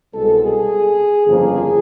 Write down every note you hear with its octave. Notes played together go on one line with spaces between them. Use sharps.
C2 B2 G#3 A4
G#4
G1 F2 C#3 F3 A#3 G#4